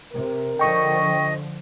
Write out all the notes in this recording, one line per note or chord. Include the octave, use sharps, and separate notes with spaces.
C3 A#4
D3 F3 D#5 G5 C#6